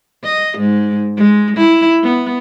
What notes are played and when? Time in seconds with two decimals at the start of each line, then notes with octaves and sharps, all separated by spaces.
0.24 D#5
0.58 G#2
1.17 G#3
1.57 E4
2.03 B3